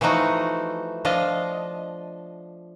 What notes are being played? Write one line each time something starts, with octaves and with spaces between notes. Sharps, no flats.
E3 F3 A3 D#4 F#4
F3 D4 F4 D#5